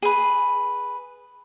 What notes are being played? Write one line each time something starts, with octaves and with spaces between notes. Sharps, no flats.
G#4 B4